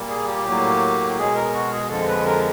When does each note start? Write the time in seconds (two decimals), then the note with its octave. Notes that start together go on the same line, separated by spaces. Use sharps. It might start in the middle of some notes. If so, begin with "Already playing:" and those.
Already playing: A#2 G3 A#3
0.09 G#4
0.28 G4
0.46 A2 F#3 A#3
1.18 B2 G#3 G#4
1.36 A#4
1.54 F#4
1.71 G#4
1.89 F2 D3 F3 G#3 A4
2.08 B4
2.26 A#4